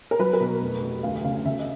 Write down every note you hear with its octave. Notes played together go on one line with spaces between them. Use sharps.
A#4
F#3 B4
A#4
B2
B4
F1
F1
D2 F5
C#3 F5
C#3 E5
D#5